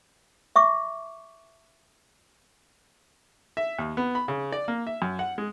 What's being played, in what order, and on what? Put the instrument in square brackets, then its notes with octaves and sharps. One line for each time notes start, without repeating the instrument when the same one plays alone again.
[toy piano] E5 C#6 D6
[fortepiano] E5
D#2
B3
B5
C#3
D5
A#3
E5
F#2
F#5
G#3